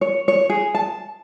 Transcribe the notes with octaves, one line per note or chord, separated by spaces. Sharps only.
C#5
C#5
G#4
A5